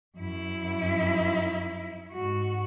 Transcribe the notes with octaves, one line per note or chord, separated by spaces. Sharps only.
F#2 E4
G#2 F#4